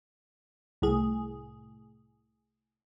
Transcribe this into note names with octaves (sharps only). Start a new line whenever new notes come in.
C2 A2 G#4